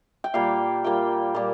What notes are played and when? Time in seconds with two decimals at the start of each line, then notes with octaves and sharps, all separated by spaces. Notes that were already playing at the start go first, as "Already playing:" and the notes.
0.24 G5
0.34 A#2 G3 A#3 F5
0.84 A#2 G3 A#3 G5
1.35 A#2 G3 A#3